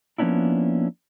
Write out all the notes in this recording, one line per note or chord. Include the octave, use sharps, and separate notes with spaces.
F3 A#3 B3 C#4 D4 E4